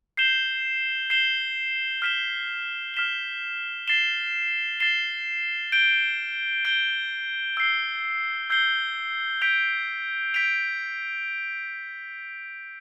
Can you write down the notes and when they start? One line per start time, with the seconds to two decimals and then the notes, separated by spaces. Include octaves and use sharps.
0.17 G6 C7 E7 G7
1.10 G6 C7 E7 G7
2.02 F6 B6 E7 G7
2.94 F6 B6 E7 G7
3.88 A6 C7 E7 G7
4.80 A6 C7 E7 G7
5.72 G6 D7 G7
6.65 G6 D7 G7
7.57 E6 G6 C7 G7
8.50 E6 G6 C7 G7
9.42 G6 B6 D7 F7
10.34 G6 B6 D7 F7